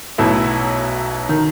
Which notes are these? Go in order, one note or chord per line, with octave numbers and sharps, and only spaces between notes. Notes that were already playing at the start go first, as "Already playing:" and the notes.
B1 B2 F#3 A3 E4
D#3